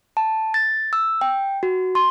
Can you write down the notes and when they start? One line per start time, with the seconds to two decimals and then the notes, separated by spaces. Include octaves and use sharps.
0.17 A5
0.54 A6
0.93 E6
1.21 G5
1.63 F#4
1.95 C6